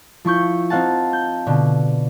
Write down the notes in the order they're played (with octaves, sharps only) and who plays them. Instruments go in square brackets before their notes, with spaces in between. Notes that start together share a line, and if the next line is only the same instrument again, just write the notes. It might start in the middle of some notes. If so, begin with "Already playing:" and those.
[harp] F3 E4 C#6 G6
C4 D#4 F5 F#5 A5
G6
B2 D3